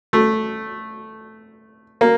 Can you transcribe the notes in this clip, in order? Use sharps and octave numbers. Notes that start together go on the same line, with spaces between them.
A3
A#3